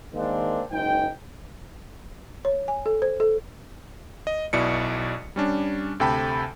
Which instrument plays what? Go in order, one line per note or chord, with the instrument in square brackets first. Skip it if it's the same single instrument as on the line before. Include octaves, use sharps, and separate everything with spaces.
[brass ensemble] D#3 G#3 A#3 C4 D4
F#1 G#2 D#4 G5
[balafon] C#5
G#5
A4
C5
A4
[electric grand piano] D#5
B1 B2 E4 D5 C#7
G3 C#4 D4
D2 C3 A4 G5 A5 B5